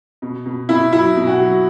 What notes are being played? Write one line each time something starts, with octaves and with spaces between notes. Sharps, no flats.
B2
B2
B2 E4
F#3 E4
B2
F#4
F#3